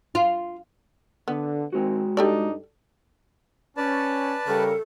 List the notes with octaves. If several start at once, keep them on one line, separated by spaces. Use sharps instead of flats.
F4
D3 B3
D#3 G#3 C4 F#4
G2 D4 D#4 G4 A4 D5
C#4 B4 D5 A5
C#3 G3 A4 A#4